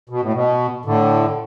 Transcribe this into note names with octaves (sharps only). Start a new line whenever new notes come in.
B2
A2
B2
A2 D3